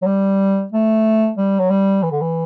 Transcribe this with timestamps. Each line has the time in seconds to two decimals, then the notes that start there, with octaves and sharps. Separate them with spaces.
0.02 F#3
0.06 G3
0.72 A3
1.38 G3
1.60 F#3
1.70 G3
2.03 E3
2.12 D3
2.21 E3